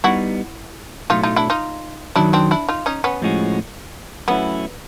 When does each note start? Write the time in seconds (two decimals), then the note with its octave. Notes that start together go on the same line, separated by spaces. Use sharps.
0.04 G3 B3 D#4 E4 F#4
1.10 B1 A2 F#3 A3 D#4 F4
1.23 D#4 F4
1.36 D4 E4
1.50 D#4 F4
2.16 F#2 D#3 F#3 D4 E4
2.33 C4 D4
2.51 D4 E4
2.69 D#4 F4
2.86 C#4 D#4
3.04 B3 C#4
3.22 A2 F3 G#3 C#4 F#4
4.28 F#3 A3 B3 C#4 E4